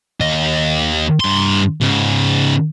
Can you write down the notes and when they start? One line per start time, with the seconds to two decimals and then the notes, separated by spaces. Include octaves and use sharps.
0.21 D#2 D#5
1.20 G2 C6
1.82 G#2 C#3